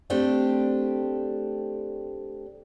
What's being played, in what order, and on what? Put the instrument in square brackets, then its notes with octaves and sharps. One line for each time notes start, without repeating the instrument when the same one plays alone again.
[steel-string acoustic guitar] A3 C4 D4 G4